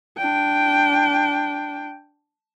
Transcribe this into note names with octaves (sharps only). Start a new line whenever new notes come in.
D4 G5